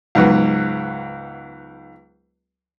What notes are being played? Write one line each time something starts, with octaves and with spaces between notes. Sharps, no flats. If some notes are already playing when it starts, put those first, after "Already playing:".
C#2 G#2 F#3 B3